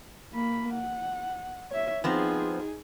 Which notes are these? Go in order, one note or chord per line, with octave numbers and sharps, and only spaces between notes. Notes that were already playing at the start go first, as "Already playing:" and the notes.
A#3 B5
F#5
C#5 E5
F3 B3 C4 D#4 G#4